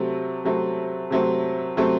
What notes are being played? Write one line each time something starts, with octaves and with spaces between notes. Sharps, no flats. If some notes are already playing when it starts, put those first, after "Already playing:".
Already playing: C3 F#3 A3 C4
C3 F#3 A3 C4
C3 F#3 A3 C4
C3 F#3 A3 C4